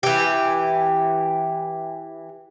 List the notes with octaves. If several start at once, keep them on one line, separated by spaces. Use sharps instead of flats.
E3 G4